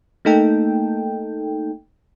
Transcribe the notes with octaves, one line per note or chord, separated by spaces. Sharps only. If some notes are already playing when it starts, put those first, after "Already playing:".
A3 A#3 D#4 A4 G5